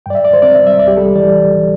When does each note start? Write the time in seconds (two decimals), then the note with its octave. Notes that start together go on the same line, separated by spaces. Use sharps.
0.06 G2 D5 G5
0.15 E5
0.24 G2 D5
0.33 C5
0.42 C4 D5
0.55 E5
0.60 G3
0.67 E5
0.79 C2 D5
0.88 G4
0.97 G3 A4
1.16 E3 D5